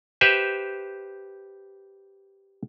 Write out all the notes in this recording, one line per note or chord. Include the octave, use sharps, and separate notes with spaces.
G4 B4 C5 E5